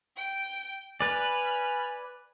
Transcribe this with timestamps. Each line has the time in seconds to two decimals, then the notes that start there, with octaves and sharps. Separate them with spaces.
0.16 G5
1.01 B4 D5 G#5 B5 F6